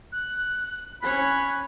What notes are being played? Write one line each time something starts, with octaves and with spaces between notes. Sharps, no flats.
F#6
C#4 C#5 B5 F#6